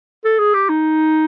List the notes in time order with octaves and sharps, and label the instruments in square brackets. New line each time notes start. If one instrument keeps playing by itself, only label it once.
[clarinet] A4
G#4
G4
D#4